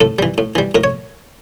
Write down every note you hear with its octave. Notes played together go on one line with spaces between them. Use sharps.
A2 A4
E3 G3
A2
E3 G3
A2 A#4
C#5